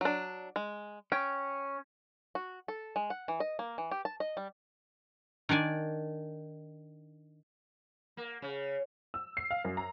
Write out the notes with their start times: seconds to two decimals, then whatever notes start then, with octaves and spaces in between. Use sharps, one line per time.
0.01 F#3 D4
0.56 G#3
1.12 C#4 G5
2.35 F#4
2.68 A4
2.96 G#3
3.10 F#5
3.28 E3
3.40 D#5
3.59 A#3
3.78 E3
3.91 G4
4.05 A5
4.20 D#5
4.37 G3
5.49 D#3 D4 D5 G#5
8.17 A#3
8.42 C#3
9.14 E6
9.37 C7
9.51 F5
9.65 F#2
9.77 A#5